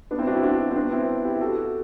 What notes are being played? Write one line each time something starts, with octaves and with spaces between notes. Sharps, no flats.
B3 D4
C4 E4
D4 F#4
C4 E4
D4 F#4
C4
B3 D4
C4 E4
E4 G4
F#4 A4